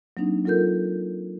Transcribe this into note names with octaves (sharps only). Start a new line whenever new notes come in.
F#3 A#3 C4 D4 D#4
F#3 F4 A4 A#4 G6